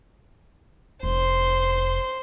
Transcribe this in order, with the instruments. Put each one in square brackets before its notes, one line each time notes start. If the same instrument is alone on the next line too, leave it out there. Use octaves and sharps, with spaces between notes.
[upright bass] F1 [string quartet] C5 C6